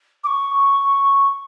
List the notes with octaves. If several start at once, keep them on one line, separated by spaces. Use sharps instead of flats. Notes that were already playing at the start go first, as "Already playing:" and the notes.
D6
C#6